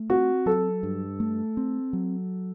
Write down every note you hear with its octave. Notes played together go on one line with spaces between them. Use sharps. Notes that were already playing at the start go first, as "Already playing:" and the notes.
Already playing: A3
C4 F#4
F#3 A4
G2
A3
C4
F#3